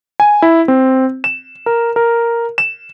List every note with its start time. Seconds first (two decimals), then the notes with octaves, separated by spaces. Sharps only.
0.20 G#5
0.42 E4
0.68 C4
1.24 E7
1.66 A#4
1.96 A#4
2.58 E7